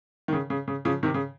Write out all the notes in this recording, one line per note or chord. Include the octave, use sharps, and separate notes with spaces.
D#3
C#3
C#3
C#3
C#3 F3
C3 D#3
C#3